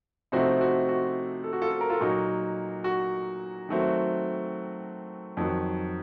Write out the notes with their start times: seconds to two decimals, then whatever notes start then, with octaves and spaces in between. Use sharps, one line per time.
0.32 C3 F3 A3 C4 D#4 F#4
0.61 F#4
0.89 F#4
1.44 A4
1.53 F#4
1.61 F4 A4
1.72 A4
1.81 A#4
1.90 F4 A4
2.00 A#2 F#3 A#3 D#4 F#4
2.84 F#4
3.69 D#3 F#3 A3 C4
5.37 F2 D#3 F#3